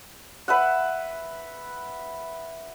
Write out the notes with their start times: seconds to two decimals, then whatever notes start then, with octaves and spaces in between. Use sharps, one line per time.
0.48 B4 E5 F#5